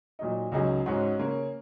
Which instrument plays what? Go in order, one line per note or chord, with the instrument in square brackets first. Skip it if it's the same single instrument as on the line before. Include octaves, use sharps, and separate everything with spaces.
[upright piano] A#2 F#3 D#4
C#2 C#3 F#3 D#4 G#4
G#2 G#3 C#4 F#4
C#3 A#3 C#4